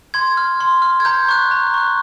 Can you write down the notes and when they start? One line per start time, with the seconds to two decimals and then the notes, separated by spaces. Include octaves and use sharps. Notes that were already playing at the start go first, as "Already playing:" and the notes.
0.14 C6 G#6
0.37 F6
0.60 C6
0.82 F6
1.00 G#6
1.05 A#5 G6
1.29 C#6 F#6
1.51 A#5
1.74 C#6 F#6